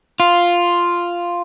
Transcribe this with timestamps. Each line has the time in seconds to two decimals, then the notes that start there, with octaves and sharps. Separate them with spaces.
0.20 F4